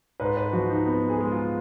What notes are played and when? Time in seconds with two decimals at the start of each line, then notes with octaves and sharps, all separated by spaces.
0.20 G#2 B4
0.37 B4
0.53 F3 F#4
0.71 D#4
0.87 B3
1.09 G#4
1.21 G#3
1.31 F4